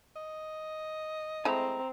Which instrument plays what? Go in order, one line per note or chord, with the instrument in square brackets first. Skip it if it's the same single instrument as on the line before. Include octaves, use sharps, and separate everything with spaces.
[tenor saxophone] D#5
[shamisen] G#3 A3 E4 [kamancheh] C4 [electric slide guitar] G#5 A#5